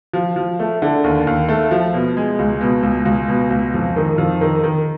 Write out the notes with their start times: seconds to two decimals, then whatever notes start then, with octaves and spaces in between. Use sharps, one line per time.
0.14 F3
0.36 F3
0.60 A3
0.82 D3
1.04 D#2
1.27 D#2
1.49 A3
1.71 F3
1.94 B2
2.17 G#3
2.39 C#2
2.61 B2
2.83 C#2
3.05 C#2
3.28 B2
3.50 C#2
3.74 F2
3.96 D#3
4.18 F2
4.41 D#3
4.63 D#3